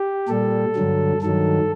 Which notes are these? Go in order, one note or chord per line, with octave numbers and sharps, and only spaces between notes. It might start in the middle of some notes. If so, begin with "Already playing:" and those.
Already playing: G4
A#2 G3 A4
G2 D3 F#3
G2 D#3 F#3 A4